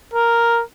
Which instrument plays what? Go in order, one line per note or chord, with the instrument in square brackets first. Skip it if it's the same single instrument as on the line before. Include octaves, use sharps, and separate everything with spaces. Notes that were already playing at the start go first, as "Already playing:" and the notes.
[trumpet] A#4